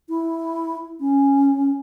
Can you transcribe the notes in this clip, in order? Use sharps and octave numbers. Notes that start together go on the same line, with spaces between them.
E4
C#4